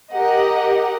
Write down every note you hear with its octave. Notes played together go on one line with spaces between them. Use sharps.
G4 A#4 D#5 F#5